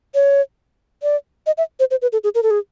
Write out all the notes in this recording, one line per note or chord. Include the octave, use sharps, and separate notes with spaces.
C#5
D5
D#5
E5
C5
C5
B4
A4
G#4
A#4
A4
G#4